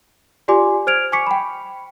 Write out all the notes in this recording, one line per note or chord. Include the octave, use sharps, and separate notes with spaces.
F4 G4 D5 G#5 C6 D6
C5 F6 G#6 D7 F7
G#5 C#6 D6 B6 C#7
G5 B5